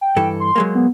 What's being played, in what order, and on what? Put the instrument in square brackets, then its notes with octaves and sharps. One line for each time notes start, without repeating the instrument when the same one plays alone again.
[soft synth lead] G5
[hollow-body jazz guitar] G2 E3 A4
[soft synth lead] C6
[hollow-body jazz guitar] F#3 G#3 A#3
[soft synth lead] B3